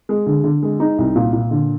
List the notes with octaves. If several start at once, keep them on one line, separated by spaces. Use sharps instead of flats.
G#3
D3
D3
G#3
D#4
C2
A#2
A#2
D3